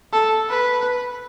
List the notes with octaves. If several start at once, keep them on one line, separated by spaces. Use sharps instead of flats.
A4
B4